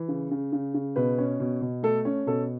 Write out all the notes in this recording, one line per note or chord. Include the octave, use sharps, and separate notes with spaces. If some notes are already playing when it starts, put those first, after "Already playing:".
Already playing: E3
C#3
C#3
C#3
C#3
B2 B4
C#4
B2
B2
A3 A4
C#4
B2 A4